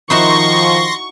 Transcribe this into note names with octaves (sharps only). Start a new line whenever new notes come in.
D#3 F3 D#4 E4 F#4 C6 C#6 A#6